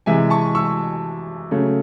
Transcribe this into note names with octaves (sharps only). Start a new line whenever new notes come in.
C3 E3 G#3 E5 G#5
A5 C#6
C#6 E6
C#3 F#3 A3